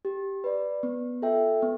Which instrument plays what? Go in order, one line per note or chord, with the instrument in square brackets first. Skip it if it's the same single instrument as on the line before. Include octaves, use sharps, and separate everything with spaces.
[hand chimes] G4
B4 D5
B3
F4 A4 E5 G5
B3